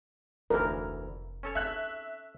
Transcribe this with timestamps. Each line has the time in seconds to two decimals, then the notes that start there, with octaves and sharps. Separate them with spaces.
0.50 F1 D2 E3 A#4
1.43 C#4 A4 C#5
1.55 D#4 E5 F#6